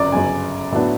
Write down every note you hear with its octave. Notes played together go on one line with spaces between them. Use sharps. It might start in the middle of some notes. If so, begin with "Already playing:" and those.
Already playing: G1 F#2 C#3 D5 D#5
G1 F#2 C#3 G#5
A2 F#3 B3 D4